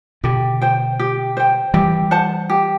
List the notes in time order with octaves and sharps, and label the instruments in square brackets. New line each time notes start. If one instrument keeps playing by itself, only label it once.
[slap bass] B2 D3 [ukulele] G4
[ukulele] C5 G5
G4
C5 G5
[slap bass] E3 G3 [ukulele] G4
[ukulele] C5 F#5 A5
G4